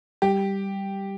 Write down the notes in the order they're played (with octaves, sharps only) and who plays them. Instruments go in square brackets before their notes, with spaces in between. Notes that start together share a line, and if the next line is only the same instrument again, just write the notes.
[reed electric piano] G3 [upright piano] G4